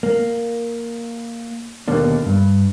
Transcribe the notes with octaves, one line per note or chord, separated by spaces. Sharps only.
A#3
D#2 B2 D3 A#3 D4
G2